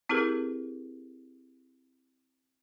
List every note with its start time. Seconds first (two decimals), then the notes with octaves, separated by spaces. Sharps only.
0.09 C4 E4 G4 G#4 A#4 B4